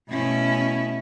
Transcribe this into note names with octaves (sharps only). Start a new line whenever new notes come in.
B2 A3 C#4 E4